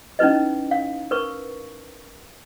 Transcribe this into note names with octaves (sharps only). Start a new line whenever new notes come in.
C#4 D#4 E4 B4 D#5
F5
A#4 B4 C#6